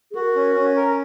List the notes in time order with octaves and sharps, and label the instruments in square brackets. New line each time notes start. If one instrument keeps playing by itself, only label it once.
[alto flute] G#4
[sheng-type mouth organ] F#4 [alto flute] A#4
[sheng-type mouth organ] C#4
C#4
A#4